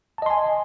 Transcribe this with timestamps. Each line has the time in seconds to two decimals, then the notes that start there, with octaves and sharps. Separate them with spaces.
0.18 A5
0.22 D#5
0.26 C6
0.30 G#5